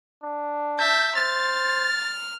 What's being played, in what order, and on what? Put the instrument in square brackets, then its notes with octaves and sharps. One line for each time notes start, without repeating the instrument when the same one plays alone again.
[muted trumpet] D4
[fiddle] E5 A5 [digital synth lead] G6
[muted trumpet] C5 [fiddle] F6 [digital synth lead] A6